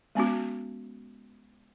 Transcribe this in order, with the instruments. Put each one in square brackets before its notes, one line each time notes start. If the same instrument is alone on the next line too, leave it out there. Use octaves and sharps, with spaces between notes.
[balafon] G#3 B3 C#4 F#4